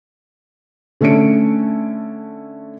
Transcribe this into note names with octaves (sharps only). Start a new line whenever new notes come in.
D3 A3 C#4 A4 C#7 D7